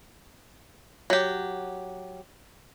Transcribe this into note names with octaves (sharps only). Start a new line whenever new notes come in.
F#3 G4